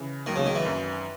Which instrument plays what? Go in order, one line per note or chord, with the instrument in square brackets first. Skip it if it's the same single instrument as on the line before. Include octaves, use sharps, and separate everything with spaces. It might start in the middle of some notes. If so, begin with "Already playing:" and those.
Already playing: [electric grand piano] C#3 E3
[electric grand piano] C#2 B2 F#3 A#3 [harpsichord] D#3
[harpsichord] C#3
D#3
E3
[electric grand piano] G#1 F#2 D#3